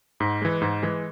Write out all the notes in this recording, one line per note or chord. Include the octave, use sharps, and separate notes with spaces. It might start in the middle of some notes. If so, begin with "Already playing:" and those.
G#2
E3 G#3
G#2
E3 G#3